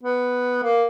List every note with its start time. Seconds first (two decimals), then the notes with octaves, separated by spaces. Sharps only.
0.03 B3
0.63 A#3